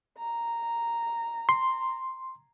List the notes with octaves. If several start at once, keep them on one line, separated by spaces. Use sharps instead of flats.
A#5
C6